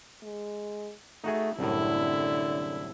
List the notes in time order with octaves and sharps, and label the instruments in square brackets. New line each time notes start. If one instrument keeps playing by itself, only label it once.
[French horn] G#3
[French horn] A3 [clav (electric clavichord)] D#4 F#4 G#4
[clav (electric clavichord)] C2 F#2 A2 [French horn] D3 [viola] E4